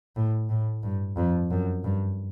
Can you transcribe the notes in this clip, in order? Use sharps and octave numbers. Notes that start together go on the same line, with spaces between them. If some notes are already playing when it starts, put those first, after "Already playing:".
A2
A2
G2
F2
F#2
G2